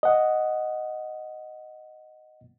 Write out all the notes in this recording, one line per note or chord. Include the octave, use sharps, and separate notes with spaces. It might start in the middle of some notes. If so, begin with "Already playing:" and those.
D#5 F#5